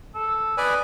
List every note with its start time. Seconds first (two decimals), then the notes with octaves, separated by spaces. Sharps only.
0.15 A4
0.57 B4 D5 D#5 G#5